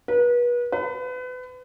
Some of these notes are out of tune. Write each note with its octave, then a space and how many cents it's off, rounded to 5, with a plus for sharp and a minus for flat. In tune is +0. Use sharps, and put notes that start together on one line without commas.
B4 -35
B4 +30